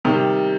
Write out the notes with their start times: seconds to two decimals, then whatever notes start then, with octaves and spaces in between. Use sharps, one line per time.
0.05 C3 D#3 G3